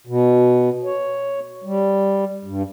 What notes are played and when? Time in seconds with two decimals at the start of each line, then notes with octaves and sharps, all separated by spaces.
0.07 B2
0.84 C#5
1.64 G3
2.45 G2